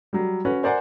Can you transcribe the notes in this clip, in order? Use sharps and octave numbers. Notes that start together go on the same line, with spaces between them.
F#3 G3
C#4 F#4 B4
A#4 C5 D5 F#5 G#5 C6